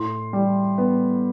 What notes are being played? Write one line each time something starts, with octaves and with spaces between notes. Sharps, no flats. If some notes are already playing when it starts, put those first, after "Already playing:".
Already playing: A2 C6
G3
B3